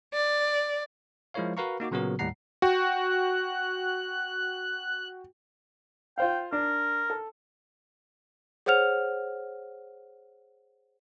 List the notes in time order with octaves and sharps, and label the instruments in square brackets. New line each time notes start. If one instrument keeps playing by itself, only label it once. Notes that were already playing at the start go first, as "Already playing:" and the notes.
[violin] D5
[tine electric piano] F3 G#3 E4 A#4 C#5 F5
F#4 A#4 B4 F5 A#5 C#6
A#3 D#4 F#4 D6
A#2 C#3 F#3 B3 F#4 A#4
D#2 A2 G3 F#5 A#5 C7
[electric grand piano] F#4 G5 [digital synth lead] F#6
[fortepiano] F4 C5 F5 [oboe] G5
[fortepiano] D4 [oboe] A#4
[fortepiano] A4
[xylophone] G#4 C5 C#5 F#5 F6 F7